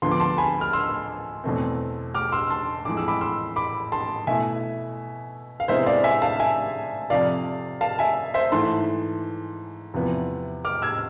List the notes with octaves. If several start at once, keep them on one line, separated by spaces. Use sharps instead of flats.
D2 D3 F3 B3 C6
D6
A5 C6
G#5 B5
F6
C6 E6
E2 B2 A3 C4
D6 F6
C6 E6
A5 C6
F2 E3 G#3 D6
E6
B5 D6
C6 E6
B5 D6
A5 C6
B2 A3 E4 E5 G#5
F5
C3 G#3 B3 E4 C5 E5
D5 F5
E5 G#5
F5 A5
E5 G#5
F2 C3 F3 D5 F5
F5 A5
E5 G#5
C5 E5
G#2 E3 A3 A5 C6
E2 C3 F3 B3 E4
D6 F6
E6 G#6